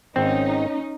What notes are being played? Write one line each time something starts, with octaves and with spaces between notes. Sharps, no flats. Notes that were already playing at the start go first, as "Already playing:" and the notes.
G#1 C4 C#4 D#4